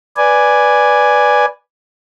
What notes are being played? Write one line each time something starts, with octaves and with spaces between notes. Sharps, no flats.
B4 D5 G#5